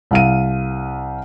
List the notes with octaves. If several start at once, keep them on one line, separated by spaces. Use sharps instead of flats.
C2 F5 D#7